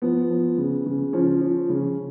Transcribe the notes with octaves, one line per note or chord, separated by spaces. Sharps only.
F3 B3
F3
C#3
C#3
F3 C#4
F3
C#3